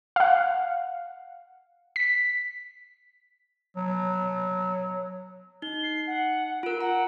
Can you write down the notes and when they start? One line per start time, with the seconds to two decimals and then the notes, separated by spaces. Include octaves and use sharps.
0.16 F5 F#5
1.96 B6
3.77 F#3
5.62 D#4 G7
5.83 C7
6.07 F#5
6.63 F4 A#4 D7
6.81 F#5 A#5